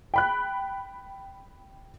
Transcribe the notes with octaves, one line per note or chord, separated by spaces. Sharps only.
G5 B5 F#6